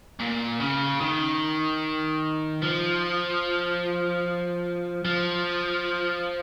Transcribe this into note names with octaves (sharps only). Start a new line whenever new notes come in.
A#2
C#3
D#3
F3
F3